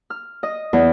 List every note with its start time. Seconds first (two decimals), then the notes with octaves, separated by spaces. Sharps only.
0.10 F6
0.43 D#5
0.73 E2